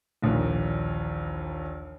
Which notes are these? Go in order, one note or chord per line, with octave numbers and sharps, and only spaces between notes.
A#1 D#2 A#2 E3